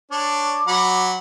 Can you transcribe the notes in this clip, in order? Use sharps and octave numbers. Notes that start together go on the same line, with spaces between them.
D4 C#5 D5 D6
F#3 F#5 B5